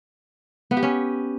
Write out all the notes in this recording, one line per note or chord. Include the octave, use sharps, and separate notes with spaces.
B3
G4
C#4